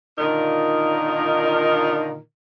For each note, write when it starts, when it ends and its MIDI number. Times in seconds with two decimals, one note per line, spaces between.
0.18 2.18 46
0.18 2.18 50
0.18 2.18 51
0.18 2.18 63
0.18 2.18 65
0.18 2.18 70